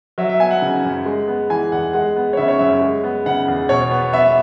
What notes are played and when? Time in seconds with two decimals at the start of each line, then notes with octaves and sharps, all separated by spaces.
0.18 F#3 E5
0.29 E5
0.40 B3 G#5
0.51 F#5
0.62 C#3
0.85 F#2
1.06 G#3
1.28 B3
1.50 E3 G#5
1.72 E2 F#5
1.93 G#3 F#5
2.16 B3
2.33 C#5
2.37 C#3 E5
2.48 C#5
2.59 F#2 E5
2.82 G#3
3.04 B3
3.26 C#3 F#5
3.48 E2
3.69 B2 C#5
3.91 B3
4.13 B3 E5